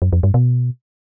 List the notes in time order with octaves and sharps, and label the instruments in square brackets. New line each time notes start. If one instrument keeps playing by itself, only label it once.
[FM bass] F#2
F2
G2
B2